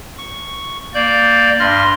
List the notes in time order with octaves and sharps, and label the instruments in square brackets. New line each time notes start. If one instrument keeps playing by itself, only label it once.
[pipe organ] C#6
A#3 D5 G6
G2 C6 F6 A#6